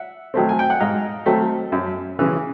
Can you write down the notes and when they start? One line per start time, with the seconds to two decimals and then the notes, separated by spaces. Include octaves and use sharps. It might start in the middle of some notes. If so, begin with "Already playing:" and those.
Already playing: E5 F#5
0.34 D#3 F#3 A3 C4
0.49 G#5
0.59 G5
0.70 F#5
0.80 G#2 D#5 F5
1.26 D#3 F#3 A3 C4
1.72 F#2
2.19 C#3 E3